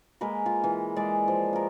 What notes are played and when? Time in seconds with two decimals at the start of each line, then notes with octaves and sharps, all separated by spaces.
0.21 G#3 A#3 A#4 B4
0.46 F4
0.64 E3
0.96 G#3 D5 E5
1.28 F3
1.53 F4 A#4